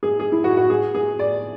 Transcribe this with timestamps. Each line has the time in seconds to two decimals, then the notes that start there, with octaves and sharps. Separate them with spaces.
0.03 G#4
0.20 G#4
0.32 E4
0.44 F#4
0.57 F#4
0.70 G#4
0.95 G#4
1.19 D5